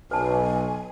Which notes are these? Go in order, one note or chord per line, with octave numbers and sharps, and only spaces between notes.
B1 B4 G#5 A5